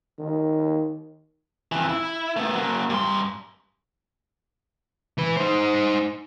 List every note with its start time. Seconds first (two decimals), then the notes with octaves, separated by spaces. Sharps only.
0.19 D#3
1.72 F2 E3
1.89 E4
2.36 A3 B3
2.55 F#3 A#3
2.90 G2 C6
5.18 E3 B4
5.37 D#4 C5